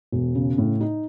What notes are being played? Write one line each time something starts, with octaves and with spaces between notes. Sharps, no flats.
E1
C#3
A2
D#4